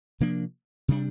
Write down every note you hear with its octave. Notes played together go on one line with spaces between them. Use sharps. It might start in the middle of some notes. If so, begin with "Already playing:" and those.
C3 F3 A#3 D4
C3 G3 D4